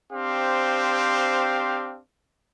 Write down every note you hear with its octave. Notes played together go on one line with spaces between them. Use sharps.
C4 D4 G4 C5 F5